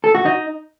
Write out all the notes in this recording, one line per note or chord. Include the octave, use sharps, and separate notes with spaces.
A4
F#4
D#4